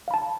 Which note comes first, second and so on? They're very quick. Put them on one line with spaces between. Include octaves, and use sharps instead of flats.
F5 B5 A5